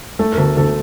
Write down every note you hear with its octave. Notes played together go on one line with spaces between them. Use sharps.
A3 A4
A#4
D2 A4
D2 A4